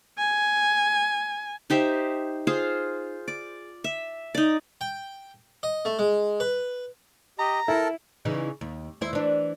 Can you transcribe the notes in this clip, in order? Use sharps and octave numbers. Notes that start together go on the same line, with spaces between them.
G#5
D#4 G4 C5 E5
F4 G#4 C5 F5
D5
E5
D#4 D5
G5
D#5
A3
G#3
B4
G4 D#5 A#5
E4 A4 A#4 A5
C#3 E3 D#4
D#2
D#2 E4 C5
E3 D4